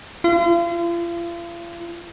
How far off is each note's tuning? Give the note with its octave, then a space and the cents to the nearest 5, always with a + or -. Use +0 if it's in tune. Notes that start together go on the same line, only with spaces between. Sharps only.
F4 -40